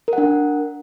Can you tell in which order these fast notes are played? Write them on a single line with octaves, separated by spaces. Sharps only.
A#4 F#5 D4